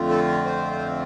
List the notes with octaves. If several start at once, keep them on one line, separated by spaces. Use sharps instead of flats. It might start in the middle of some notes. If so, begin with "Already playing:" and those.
Already playing: F2 D3 A3 C4 F4
A4
C5